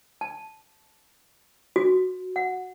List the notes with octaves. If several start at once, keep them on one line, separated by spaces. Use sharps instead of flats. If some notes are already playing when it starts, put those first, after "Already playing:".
A5
F#4
F#5